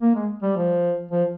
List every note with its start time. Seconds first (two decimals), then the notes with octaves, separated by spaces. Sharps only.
0.02 A#3
0.15 G#3
0.42 G3
0.56 F3
1.11 F3